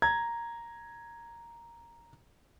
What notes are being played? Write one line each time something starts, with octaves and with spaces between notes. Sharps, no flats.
A#5 G#6